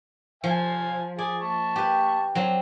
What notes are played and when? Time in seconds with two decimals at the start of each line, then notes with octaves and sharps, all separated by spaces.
0.44 F3 F5 G#5
1.18 G#4 D5 G#5
1.41 A5 C#6
1.76 G4 B4
2.35 F#3 C4 D4